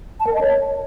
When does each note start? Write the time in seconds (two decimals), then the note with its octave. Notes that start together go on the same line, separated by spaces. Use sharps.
0.20 A5
0.27 A#4
0.34 D#5
0.41 C#5